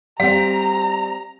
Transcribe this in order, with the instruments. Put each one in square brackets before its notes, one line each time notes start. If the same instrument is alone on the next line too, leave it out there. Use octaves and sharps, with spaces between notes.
[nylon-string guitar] G3 C4 [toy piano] F5 [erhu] A#5